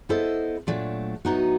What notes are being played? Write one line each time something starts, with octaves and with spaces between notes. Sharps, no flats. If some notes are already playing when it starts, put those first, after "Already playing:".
B3 E4 A4 C5 D#5
A#2 F#3 A3 D4
A2 F#3 B3 D#4 F#4